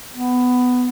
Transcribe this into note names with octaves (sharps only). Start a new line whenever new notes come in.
B3